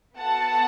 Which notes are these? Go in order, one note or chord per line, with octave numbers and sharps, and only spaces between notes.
B3 F#4 A4 F#5 A5